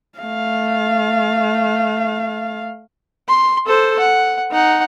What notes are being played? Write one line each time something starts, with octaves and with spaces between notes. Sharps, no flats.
A3 F5
C6
A4 C5
F#5
D#4 F#5